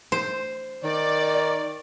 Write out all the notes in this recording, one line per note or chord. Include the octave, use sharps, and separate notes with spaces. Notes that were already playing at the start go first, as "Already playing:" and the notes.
C5
D#3 D5